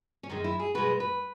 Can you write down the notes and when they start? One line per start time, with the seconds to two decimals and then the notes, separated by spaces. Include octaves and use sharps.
0.23 C#4
0.29 F#2 D#3 G#3 D#4
0.44 E4
0.59 G#4
0.75 B2 G#3 B4
1.00 B4